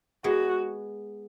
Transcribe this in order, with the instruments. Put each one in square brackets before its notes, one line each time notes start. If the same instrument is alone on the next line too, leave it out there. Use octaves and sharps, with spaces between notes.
[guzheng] G#3 B3 [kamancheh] F#4